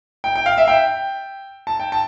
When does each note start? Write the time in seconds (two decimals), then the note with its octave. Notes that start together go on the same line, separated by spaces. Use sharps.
0.24 G5
0.36 G5
0.46 F5
0.58 E5
0.68 G5
1.67 A5
1.80 G5
1.92 A5